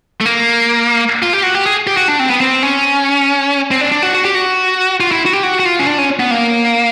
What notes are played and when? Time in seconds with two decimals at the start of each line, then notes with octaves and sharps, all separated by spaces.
0.21 A3
0.25 A#3
1.22 F4
1.33 G4
1.43 F#4
1.55 G4
1.66 G#4
1.87 G4
1.97 F#4
2.08 D4
2.19 C4
2.30 B3
2.41 C4
2.63 C#4
3.71 C4
3.81 D4
3.92 D4
4.03 F#4
4.15 F#4
4.25 G4
4.35 F#4
5.00 F4
5.11 E4
5.26 F#4
5.33 G4
5.43 F#4
5.60 F#4
5.65 F4
5.79 C#4
5.87 D4
5.98 C#4
6.19 B3
6.31 A#3